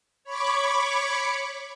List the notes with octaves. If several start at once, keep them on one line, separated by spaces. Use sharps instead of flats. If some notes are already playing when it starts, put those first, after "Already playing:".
C#5 B5 C#6 D6